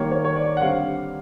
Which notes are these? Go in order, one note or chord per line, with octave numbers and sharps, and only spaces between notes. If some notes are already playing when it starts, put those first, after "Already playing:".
Already playing: D#3 G3 A#3 C#5
C#5
C#5
D5
F#5
D3 G3 C4 F5